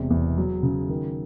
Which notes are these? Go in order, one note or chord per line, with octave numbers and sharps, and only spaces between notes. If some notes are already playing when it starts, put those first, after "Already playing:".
Already playing: E1 C3
E2
F#3
C#3
D#3